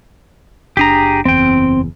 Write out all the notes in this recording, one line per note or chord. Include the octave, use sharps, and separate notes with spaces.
F#1 D4 G4 G#4 A#5
F#1 E2 C4 G5